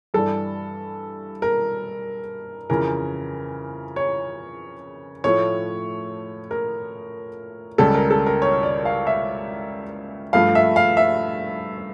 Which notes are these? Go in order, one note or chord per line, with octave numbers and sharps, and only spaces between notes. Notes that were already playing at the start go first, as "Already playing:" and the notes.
G2 E3 G3 A4
A#4
F2 C#3 E3 A#4
C#5
A2 F3 A3 C#5
A#4
C#2 C#3 G3 A4
A#4
A4
A#4
C#5
D5
F5
E5
G2 F3 A3 F5
E5
F5
E5